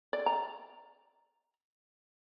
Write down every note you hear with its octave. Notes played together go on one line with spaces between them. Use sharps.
D5
A#5